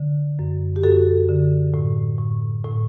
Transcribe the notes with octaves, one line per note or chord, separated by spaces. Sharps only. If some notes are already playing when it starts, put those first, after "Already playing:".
Already playing: D3
F#2
G4
F#2 F#4 A4
D3
A2
A2
A2